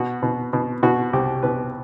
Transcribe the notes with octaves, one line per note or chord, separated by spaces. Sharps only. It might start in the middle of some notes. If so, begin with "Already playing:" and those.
Already playing: B2 F#4
B2
B2
B2 F#4
C2 G4
B2 B4